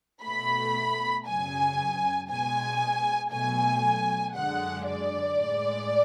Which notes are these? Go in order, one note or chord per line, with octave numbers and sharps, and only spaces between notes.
B2 A3 B5
F#2 C#3 F#3 G#5
B2 G#3 G#5
B2 F#3 A3 G#5
F#2 D3 G#3 F#5
D5
A2 G#3